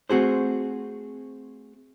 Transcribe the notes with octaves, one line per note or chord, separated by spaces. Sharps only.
A3 C4 F#4 G#4 C5